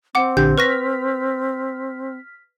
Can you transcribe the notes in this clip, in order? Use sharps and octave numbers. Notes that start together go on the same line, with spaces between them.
C4 F#5 D6
A#1 D3 G4 G6
B4 C#6 F6 A#6 B6